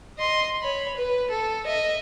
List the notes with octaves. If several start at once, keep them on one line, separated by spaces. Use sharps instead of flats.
D#5 C6
C#5 B5
B4
A4
D#5 E5